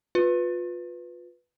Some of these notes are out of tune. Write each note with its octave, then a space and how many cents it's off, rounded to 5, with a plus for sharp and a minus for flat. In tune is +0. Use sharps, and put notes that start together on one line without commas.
F4 +25 B4 +0